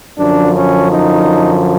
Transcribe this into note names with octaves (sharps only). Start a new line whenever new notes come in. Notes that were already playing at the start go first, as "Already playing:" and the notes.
F#2 D3 F3 D4
C#4
D#4